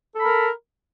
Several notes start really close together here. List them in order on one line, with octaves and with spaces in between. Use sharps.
A4 B5 A#4